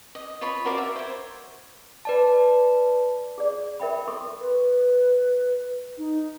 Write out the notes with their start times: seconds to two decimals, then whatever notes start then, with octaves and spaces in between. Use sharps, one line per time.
0.15 D#5
0.41 F4 C#5 B5
0.65 F#4 A#4 D5 F5
0.78 E5
0.96 C5 C#5
2.05 B4 D5 A5
3.38 G#4 D5
3.80 A#4 E5 G5 B5
4.07 A4 C6 C#6
4.41 B4
5.98 D#4